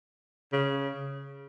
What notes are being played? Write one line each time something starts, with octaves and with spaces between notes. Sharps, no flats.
C#3